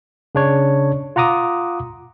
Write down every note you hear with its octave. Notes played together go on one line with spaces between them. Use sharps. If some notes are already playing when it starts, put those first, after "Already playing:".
C#3 D4 C#5
F4 F#5 A#5 D6 D#6